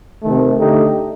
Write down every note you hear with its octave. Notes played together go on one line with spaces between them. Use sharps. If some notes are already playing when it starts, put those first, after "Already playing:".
C3 D#3 A3
D3 A3 D#4 G4